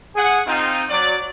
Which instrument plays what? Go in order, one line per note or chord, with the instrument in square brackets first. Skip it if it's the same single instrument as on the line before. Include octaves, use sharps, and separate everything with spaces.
[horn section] G#4 F#5
C4 D#4 F4
F#3 D5